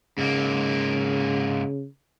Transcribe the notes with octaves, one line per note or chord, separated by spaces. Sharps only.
G#2 C#3 A#3